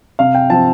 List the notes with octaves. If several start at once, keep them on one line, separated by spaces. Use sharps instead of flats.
C3 F5
G5
F3 C4 A5